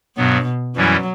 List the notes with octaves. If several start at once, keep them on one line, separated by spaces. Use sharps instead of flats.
G2 B2 F#3 B3
F#2 E3 F#3 G3 C#4 E4